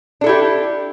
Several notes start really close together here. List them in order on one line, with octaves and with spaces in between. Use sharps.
D4 A4 E4 G4